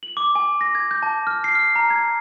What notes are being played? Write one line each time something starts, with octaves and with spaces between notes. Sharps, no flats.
F#7
D6
G#5
A#6
G#6
G6
A5
F6
C7
F6
A#5
G#6